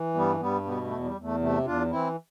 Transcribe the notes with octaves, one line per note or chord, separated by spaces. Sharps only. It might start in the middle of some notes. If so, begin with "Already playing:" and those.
Already playing: E3
G2 G3 B3
G2 G3 B3
B2 G3 B3
A3
E2
G3
E2
A3
C3 A3
E2 D4 F4
E3 C4 E4